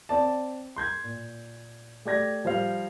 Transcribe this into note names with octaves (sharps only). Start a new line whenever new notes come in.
C4 D5 A5
C6 G6 G#6
A#2
A3 G4 D5 G#6 A#6
F3 G3 C5 F5